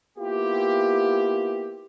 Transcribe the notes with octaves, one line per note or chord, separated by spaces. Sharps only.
A#3 B3 E4 F4 G4